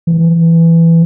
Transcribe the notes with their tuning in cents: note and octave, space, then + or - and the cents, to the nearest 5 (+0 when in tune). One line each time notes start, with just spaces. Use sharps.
E3 +10